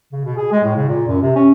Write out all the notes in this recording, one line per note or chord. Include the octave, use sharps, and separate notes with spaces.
C#3
B2
G#4
G#3
A2
C#3
A#2
F#2
C3
C#4